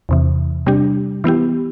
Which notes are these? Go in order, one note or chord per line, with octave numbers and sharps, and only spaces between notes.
E2 C3 E3
C3 G3 D4 G4
E3 B3 E4 G4